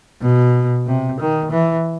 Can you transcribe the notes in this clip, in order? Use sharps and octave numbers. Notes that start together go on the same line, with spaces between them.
B2
C3
D#3
E3